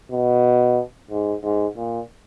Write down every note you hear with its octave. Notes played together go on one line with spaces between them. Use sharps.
B2
G#2
G#2
A#2